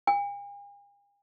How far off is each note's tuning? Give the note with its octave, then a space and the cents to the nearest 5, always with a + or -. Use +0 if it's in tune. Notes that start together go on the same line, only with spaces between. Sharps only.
G#5 -45